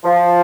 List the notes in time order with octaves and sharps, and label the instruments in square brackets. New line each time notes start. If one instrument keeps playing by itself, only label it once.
[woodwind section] F3